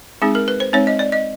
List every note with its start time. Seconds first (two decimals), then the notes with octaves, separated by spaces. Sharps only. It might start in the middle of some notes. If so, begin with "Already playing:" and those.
0.22 G#3 C4 D#4 G#4
0.35 A#4
0.48 B4
0.60 C5
0.73 G#3 C4 D#4 C#5
0.87 D#5
0.99 D5
1.12 D#5